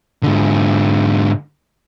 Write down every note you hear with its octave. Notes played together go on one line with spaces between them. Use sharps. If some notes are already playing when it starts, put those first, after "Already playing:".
G#2 D3